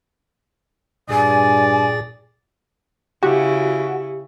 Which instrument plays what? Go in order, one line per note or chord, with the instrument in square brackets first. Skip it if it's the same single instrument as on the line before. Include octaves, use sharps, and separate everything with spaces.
[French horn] G2 [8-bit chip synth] A#2 G#4 A6 [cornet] D5 [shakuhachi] G#5
[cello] C#3 E4 [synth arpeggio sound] F#4 [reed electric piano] G4